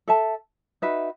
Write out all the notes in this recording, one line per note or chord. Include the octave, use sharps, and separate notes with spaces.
A4 E5 A5
D#4 F#4 B4 E5